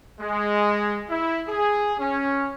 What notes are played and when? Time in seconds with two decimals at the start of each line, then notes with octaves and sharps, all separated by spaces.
0.21 G#3
1.10 E4
1.48 G#4
1.99 C#4